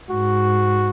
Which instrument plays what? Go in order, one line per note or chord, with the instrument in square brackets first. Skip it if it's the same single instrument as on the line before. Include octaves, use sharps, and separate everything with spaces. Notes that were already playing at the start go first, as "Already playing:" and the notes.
[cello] G#2 [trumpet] F#4